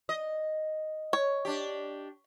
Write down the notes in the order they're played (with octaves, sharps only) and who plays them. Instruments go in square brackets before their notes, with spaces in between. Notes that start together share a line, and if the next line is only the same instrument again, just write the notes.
[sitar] D#5
[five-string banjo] C#5
[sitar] D4 G4